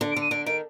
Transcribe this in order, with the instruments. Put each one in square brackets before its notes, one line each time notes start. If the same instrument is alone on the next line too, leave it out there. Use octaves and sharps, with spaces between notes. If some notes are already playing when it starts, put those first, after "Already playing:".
[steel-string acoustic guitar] D3
[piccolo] D7
[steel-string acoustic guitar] D3
[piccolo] D#7
[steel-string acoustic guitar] D3 [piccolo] D7
[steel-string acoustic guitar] D#3 [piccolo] D7